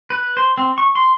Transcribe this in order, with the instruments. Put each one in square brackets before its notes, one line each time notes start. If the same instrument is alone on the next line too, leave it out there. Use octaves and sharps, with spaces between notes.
[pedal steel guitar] B4
C5
C4
C#6
C6